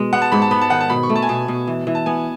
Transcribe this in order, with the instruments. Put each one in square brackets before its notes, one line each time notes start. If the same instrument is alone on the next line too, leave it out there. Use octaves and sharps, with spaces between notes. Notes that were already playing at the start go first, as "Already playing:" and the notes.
Already playing: [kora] B2 G#3
[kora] B3 [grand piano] F#5
[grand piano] A5
[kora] G#2 [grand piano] B5
[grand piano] A5
[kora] B3 [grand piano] B5
[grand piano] A5
[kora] D#3 [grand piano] F#5
[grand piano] A5
[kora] B2 [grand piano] B5
[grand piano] C#6
[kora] A3
[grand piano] A5
G#5
[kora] B2 [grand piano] A5
[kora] B2
E3
E3
[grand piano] A5
[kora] B3 [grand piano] G#5